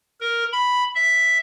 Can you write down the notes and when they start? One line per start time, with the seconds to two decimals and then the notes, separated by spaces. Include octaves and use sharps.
0.21 A#4
0.52 B5
0.95 E5